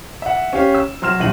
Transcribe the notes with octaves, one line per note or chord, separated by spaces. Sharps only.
E5 F#5
C#4 G4 F5
E6
F#3 C6 F6 E7
D#1 F#2 A#2 E5 D#7 F#7